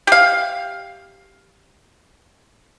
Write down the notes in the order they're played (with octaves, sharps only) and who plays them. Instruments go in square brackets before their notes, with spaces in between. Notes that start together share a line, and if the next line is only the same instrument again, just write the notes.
[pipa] G4 F5